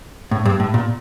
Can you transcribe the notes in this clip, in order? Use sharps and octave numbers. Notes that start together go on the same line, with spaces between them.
A2
G2
A2
A#2